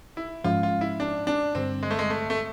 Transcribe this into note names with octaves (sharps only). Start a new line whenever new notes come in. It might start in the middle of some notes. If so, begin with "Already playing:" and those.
E4
G#2 F3 G#3 C#4 F4
F4
E4
D4
D4
G2 D3 G3 C4
G#3
A3
G#3
A3
A3